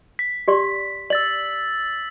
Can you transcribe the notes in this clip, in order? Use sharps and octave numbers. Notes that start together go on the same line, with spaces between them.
B6
G4 D5 C6
D5 E6 A6 F#7